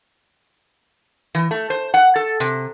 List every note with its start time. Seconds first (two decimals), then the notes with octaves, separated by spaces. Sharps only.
1.35 E3
1.51 A3
1.70 C5
1.94 F#5
2.16 A4
2.40 C3